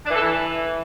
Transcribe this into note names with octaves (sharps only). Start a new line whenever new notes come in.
D4
E3
A4
E3